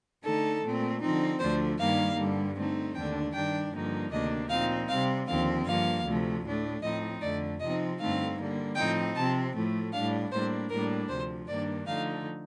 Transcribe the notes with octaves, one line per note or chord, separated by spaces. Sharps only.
D3 A3 D#4 A4
A#2 A3 C4
D3 F3 C4 D#4
D2 D3 F3 A3 D4 C5
G2 D#3 G3 A#3 D#4 F5
G2 D3 G3
D3 A3 C4 D#4
D#2 D3 A3 D4 G5
G2 D#3 G3 D4 G5
G2 D3 F3 A#3 D#4
D2 C3 D#3 A#3 D4 D#5
A#2 F3 C4 D#4 F5
C3 G3 C4 F5
D#2 D3 F3 C4 F5
G2 F3 A#3 F5
D2 C3 F3 A3
A2 A3 D4
A2 F3 C4 D#4 D#5
F2 D3 A3 D5
C3 F3 C4 D#4 D#5
G2 D3 A3 C4 D#4 F5
D3 G3 A#3
A2 F3 C4 D#4 G5
C3 F3 C4 A5
A2 F3 A3
A2 G3 D4 F5
A2 G3 A#3 D4 C5
A2 G3 A#3 D4 A#4
D2 C3 F3 C5
G2 D#3 A#3 D4 D5
D3 F3 A3 D#4 F5